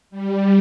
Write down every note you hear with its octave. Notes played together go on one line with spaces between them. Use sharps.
G3